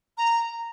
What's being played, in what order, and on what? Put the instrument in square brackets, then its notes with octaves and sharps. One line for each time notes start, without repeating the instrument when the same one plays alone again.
[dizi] A#5